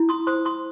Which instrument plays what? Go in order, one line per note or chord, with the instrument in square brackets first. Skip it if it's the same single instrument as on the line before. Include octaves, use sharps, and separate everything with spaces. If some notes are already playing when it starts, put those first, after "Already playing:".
Already playing: [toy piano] E4
C6 D#6
C5 C6 D#6
C6 D#6